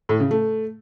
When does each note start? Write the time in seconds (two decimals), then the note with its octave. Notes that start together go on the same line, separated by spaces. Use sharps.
0.09 A2
0.20 C#3
0.31 A3